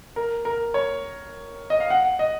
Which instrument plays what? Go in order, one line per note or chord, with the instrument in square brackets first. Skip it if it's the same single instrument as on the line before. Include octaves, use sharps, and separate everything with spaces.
[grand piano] A#4
A#4
C#5
D#5
F5
F#5
D#5